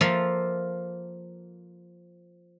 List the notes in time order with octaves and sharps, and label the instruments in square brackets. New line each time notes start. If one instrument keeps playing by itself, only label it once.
[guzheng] F3 A#3 F4 A4 A#4 E5